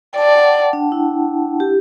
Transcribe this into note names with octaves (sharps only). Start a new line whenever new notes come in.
G5
D5 A5
F#5
D4
E4
G4